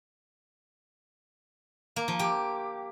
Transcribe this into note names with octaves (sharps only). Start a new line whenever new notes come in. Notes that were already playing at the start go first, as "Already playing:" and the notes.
A#3
F3
G4